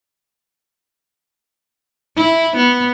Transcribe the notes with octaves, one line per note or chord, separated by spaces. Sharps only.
E4
B3